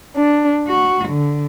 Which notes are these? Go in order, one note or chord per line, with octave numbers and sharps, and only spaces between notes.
D4
F#4
D3